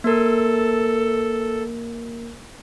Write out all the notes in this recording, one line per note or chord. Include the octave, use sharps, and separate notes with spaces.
A#3 A4 A#4